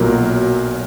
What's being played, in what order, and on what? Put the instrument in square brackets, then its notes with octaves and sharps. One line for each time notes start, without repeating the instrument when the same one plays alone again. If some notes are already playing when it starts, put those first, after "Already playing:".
Already playing: [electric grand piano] B1 A#2 F#3 A#4